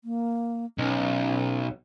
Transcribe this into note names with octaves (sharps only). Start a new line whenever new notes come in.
A#3
B1 C#4